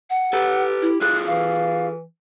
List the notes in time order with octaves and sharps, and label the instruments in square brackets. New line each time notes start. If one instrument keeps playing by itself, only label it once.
[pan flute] F#5
[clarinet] G4 [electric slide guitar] A4 B4
[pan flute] E4
[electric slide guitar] F4 G#4 A4 [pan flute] F#6
[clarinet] E3 [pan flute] F5